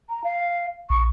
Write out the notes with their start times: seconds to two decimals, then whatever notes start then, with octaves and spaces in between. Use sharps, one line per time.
0.09 A#5
0.24 F5
0.90 A#1 C#6